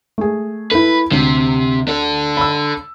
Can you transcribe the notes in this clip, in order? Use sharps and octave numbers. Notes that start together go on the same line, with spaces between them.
A3 G#4
E4 A4 B4
D2 C3
D4 A4
B5 E6